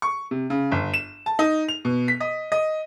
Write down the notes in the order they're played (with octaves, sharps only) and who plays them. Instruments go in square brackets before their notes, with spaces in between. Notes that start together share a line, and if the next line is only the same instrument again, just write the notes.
[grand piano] C#6
C3
C#3
G1
E7
A5
D#4
F7
B2
B6
D#5
D#5